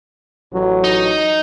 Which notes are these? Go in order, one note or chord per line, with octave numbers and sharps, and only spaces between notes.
A1 F#3
D#4